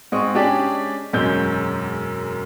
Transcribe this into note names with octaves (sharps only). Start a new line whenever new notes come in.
G#2 G#3 C4 C#6 D#6
G#3 C#4 D4 G4 G#4 D5
E1 F#2 G#3 C#4 G6